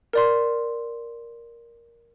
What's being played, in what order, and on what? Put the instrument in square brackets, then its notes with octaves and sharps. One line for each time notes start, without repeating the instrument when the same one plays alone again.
[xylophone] A#4 D5 C6